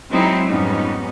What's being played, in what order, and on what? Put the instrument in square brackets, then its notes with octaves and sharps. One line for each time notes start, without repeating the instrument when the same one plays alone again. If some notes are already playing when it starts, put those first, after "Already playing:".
[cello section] F#3 G#3 C4 D#4 E4
F2 G#2 G3 B3 C#4 D#4